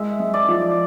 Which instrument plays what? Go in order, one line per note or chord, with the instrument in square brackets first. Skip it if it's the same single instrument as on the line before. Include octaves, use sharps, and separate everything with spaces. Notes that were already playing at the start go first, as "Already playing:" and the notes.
Already playing: [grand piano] G#3 [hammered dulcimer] E5
[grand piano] G#3
[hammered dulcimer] D5
[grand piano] F3